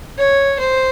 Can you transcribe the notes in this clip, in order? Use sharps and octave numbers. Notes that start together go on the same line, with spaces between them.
C#5
C5